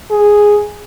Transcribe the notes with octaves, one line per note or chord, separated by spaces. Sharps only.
G#4